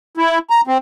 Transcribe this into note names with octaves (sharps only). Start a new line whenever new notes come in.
E4
A#5
C4